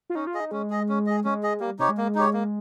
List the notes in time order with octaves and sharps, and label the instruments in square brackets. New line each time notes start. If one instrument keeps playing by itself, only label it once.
[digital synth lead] F4
[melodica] C#4 [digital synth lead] D#4
[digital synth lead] F4
[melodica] G#4 D#5
[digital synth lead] D#4
[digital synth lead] G#3 [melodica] C#4
[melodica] G#4 D#5
C#4
G#4 D#5
[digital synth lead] G#3 [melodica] C#4
[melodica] G#4 D#5
[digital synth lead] G3 [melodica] A#3
[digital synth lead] C3 [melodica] D#4 G4 C#5
[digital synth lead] G#3
[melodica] A#3
D#4 G4 C#5
A#3